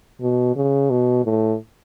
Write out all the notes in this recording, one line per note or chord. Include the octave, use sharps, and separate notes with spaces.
B2
C#3
B2
A2